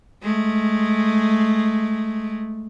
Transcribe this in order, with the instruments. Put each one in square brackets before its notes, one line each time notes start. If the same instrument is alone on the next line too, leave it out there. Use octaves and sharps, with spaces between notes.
[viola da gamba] G#3 A3